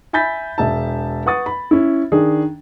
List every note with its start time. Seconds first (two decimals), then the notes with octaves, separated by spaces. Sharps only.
0.13 E5 G#5 B5 G6 A6 B6
0.58 E1 E5 A5
1.26 B4 F#5 C#6 D#6 A6
1.46 B5
1.71 C#4 E4
2.12 D#3 D4 G#4